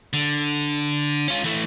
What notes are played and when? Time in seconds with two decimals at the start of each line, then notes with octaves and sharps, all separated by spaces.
0.13 D3
1.28 C#4 F4
1.44 E3 A3